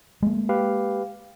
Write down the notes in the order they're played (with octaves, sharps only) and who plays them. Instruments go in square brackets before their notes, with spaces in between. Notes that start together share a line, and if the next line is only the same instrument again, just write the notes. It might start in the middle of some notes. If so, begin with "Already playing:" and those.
[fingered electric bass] G#3 A#3
[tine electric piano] G4 B4 F5